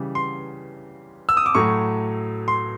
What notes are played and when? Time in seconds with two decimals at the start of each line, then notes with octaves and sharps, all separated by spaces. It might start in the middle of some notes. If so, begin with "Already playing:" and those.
Already playing: C#3 E3 G3
0.15 C6
1.29 E6
1.37 D#6
1.46 D6
1.54 A2 F#3 A3 C#6
2.48 C6